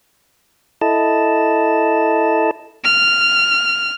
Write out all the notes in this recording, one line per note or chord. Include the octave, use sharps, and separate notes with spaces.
E4 A4 D#5 A5
F6